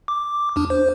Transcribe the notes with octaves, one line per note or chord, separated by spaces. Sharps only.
D6
E2 D4
C5